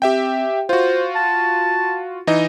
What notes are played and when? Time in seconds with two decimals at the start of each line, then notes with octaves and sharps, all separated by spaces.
0.02 C4 G4 E5 G5
0.69 F4 F#4 C5
1.15 A5
2.27 E3 D#4 D#5